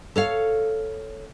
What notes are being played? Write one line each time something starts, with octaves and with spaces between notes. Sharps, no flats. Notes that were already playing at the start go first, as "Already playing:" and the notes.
A4 C#5 F5